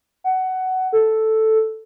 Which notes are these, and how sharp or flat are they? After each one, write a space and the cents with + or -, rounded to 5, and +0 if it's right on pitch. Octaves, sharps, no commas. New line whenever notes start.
F#5 +15
A4 +0